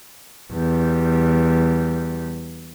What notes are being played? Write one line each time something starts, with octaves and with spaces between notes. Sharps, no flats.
E2 G3